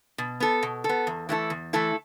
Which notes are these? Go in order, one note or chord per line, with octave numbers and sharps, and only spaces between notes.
B2
B3 A4
B2
A4
B3
E2
E3 A3 E4 A4
E2
E3 A3 E4 A4